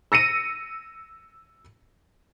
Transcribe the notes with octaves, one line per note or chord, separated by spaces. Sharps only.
E6 A#6 C#7 D#7